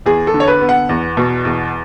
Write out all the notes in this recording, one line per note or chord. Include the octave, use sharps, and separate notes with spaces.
E2 G#4
A4
D3
C#5
B4
B3
F#5
E2
B2
E2